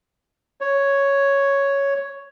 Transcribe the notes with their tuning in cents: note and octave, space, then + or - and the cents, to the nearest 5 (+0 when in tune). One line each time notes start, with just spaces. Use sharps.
C#5 +0